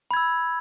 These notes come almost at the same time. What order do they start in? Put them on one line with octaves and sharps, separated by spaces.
B5 G#6 E6